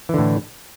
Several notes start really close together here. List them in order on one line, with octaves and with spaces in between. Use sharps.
E3 D3 A2